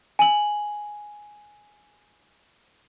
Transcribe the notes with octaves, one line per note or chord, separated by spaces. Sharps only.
G#5 F#7